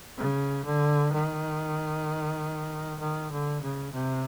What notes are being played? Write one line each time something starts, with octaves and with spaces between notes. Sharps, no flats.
C#3
D3
D#3
D#3
D3
C#3
C3